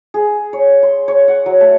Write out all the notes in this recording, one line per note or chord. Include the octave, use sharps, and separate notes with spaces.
G#4
C#5
C6
C#5
F#5
F#3
A3